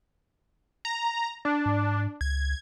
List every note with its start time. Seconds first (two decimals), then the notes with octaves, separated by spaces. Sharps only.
0.85 A#5
1.45 D4
1.66 G#2
2.21 C#2 G#6